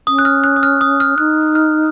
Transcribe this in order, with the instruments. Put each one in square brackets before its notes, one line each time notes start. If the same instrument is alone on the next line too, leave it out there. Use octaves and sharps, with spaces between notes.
[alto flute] C#4 [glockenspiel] D#6
[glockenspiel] F#6
F6
F#6
D#6
F6
D#6
F6
[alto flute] D#4 [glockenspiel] F#6
[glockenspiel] F6